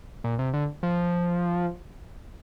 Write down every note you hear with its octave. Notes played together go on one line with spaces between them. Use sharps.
A#2
C3
D3
F3